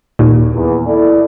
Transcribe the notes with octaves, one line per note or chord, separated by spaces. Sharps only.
D#2 A#2
E2
E4 A4 D5